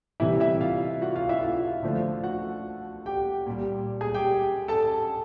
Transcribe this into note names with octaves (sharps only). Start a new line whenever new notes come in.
C3 E3 G3 E4 E5
E4 E5
F4 F5
F#4 F#5
F4 F5
E4 E5
F4 F5
D3 F3 A3
F#4 F#5
G4 G5
A#2 G3
G#4 G#5
G4 G5
A4 A5